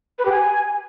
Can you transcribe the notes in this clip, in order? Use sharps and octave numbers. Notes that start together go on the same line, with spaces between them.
B4
G4
G#5